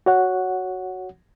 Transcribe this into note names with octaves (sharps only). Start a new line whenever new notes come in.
F#4 C#5 F#5